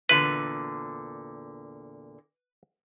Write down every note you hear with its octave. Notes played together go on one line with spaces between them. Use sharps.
E2 A#2 D3 B4